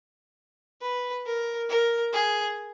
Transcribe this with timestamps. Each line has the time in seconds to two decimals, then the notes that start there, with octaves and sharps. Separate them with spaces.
0.82 B4
1.26 A#4
1.69 A#4
2.13 G#4